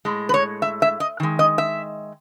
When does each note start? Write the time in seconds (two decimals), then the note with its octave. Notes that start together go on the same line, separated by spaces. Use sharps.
0.05 A2 G#3
0.29 B4
0.34 C#5
0.62 E5
0.82 E5
1.00 D#5
1.20 D#3 G#3
1.39 D#5
1.58 E5